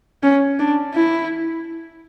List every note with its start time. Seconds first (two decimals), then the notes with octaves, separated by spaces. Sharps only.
0.23 C#4
0.59 D4
0.94 E4